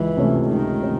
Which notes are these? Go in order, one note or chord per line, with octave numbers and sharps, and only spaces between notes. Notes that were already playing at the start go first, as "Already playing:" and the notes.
Already playing: C#2 E3
C3 F3 A3 C#4
C#2 D#3
C3 F3 A3 C#4